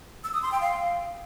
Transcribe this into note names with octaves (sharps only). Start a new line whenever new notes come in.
E6
D#6
C6
G5
F5